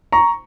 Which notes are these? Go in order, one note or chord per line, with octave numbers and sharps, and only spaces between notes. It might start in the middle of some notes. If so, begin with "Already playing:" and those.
A#5 C#6